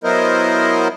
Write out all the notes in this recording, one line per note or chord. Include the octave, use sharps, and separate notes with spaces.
F#3 B3 E4 A#4 C5 D#5